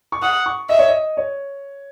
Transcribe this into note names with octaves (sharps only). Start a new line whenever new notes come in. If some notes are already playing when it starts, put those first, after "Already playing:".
C#6
F#5 D#6
C#6
D#5 E5
C#5
D#5
C#5